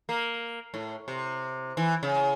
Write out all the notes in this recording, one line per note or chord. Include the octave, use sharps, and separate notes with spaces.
A#3
A2
C3
E3
C#3